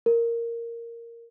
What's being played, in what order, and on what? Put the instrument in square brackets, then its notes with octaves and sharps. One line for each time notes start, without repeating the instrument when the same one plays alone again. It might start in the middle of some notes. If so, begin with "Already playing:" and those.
[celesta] A#4